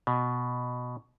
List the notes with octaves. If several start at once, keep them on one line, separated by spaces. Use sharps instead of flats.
B2